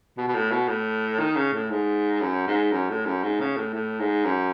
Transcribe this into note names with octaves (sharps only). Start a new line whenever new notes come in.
B2
B2
A2
B2
A2
D#3
C#3
A2
G#2
F#2
G#2
F#2
A2
F#2
G#2
C#3
A2
A2
G#2
F#2